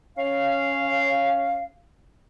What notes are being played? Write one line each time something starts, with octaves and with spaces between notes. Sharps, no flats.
C#4 F5